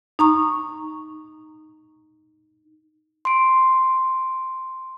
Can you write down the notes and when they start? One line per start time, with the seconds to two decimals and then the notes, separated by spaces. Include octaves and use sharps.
0.19 D#4 A#5 C#6
3.25 C6 D7